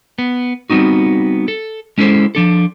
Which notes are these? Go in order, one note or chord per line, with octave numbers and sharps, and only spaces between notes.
B3
G3 B3 C4 D#4 F#4
A4
G#3 C#4 E4 A4 C5
F3 D4 A4